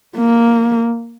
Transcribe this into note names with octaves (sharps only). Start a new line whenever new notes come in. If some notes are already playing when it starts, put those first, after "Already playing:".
A#3